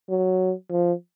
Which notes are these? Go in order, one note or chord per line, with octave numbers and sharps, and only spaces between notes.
F#3
F3